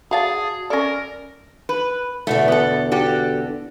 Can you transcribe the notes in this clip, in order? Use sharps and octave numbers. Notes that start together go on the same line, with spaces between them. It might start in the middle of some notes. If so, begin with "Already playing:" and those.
F#4 G#4 D5 F5 F#5 A5
C#4 A4 A#4 D5 A#6
B4
E2 B2 D3 A3
B3 A4
F#4 G4 A4